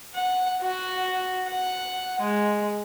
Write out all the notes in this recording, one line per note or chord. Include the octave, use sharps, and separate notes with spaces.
F#5
F#4
F#5
G#3